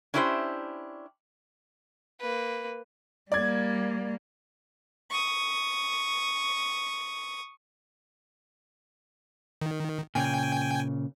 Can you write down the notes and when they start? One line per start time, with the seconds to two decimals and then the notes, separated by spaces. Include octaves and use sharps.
0.14 C#4 D4 E4 G4 B4 C5
2.20 A#3 B4
3.32 G3 A#3 D5 G#6
5.11 C#6 D#6
9.62 D#3
10.15 A#2 C#3 G5 G#5